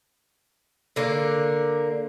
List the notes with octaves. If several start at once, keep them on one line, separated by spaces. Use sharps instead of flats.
D3 A#3